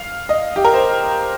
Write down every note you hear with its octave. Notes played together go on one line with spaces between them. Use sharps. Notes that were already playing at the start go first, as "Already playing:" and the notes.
Already playing: F5
D#5
G4
A#4
C5